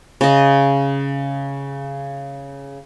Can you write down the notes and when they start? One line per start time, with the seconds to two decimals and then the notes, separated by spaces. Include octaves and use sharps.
0.21 C#3 D#5